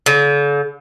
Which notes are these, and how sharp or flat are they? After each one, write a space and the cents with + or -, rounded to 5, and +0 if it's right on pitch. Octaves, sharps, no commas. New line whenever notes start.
D3 -45